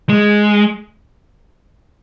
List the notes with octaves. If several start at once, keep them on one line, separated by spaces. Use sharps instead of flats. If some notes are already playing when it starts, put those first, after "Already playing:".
G#3